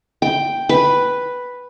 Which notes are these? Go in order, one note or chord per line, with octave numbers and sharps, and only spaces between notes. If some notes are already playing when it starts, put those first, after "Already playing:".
G5
B4